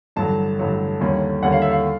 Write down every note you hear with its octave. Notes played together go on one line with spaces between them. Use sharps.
A1 G2 D3 F#3 A3 A5
A1 G2 D3 F#3 A3
D#2 D3 G3 A#3 C#4
D#2 D3 G3 A#3 C#4 F#5
F5
E5
F5